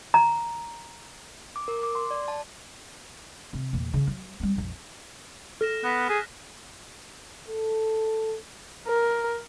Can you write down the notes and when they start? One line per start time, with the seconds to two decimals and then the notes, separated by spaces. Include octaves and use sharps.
0.14 A#5
1.56 D6
1.68 A#4
1.83 D6
1.95 C6
2.11 D5
2.28 A5
3.53 C3
3.73 E2 A#2
3.94 C#3 E3
4.07 F#3
4.40 G3 C4
4.56 A#1 F2
5.61 A4 F6 A#6 E7
5.84 B3 F#6 A#6 B6
6.09 G#4
7.49 A4
8.88 A#4